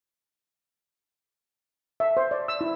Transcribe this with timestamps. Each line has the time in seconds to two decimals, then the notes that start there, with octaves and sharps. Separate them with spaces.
2.00 E5
2.17 C5
2.31 D5
2.48 E6
2.61 E4